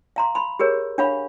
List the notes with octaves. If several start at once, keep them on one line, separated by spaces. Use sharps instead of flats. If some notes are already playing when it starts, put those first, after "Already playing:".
F5 A#5 C6
B5 C6
G4 G#4 A#4 C#5
D4 C#5 F5 F#5 B5 C#6